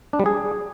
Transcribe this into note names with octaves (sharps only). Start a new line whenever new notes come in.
D4
G3
G#4